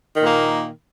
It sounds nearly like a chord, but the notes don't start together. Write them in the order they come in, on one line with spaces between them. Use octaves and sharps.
D#3 A#2 A#3